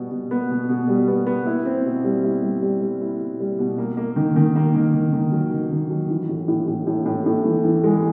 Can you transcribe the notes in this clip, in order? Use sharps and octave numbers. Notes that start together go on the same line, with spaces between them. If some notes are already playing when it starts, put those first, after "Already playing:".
Already playing: B2 G3 B3
B2
B3
B2
B2
G3
B3
B3
E4
C4
B2
G3
E4
G3
G3
G3
E4
B2
G3
B2
A#3
A#3
D#3
D#3
A#3
D#3
D#3
D#3
F#3
D#3
D#3
F#3
E3
A2
A2
A2
A2
A2
A2
E3
E3
G#3